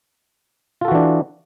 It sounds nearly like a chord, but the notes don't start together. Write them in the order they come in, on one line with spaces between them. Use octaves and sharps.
F4 A4 F#4 E3 D4